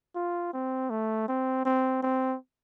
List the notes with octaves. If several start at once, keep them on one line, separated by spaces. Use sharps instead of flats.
F4
C4
A3
C4
C4
C4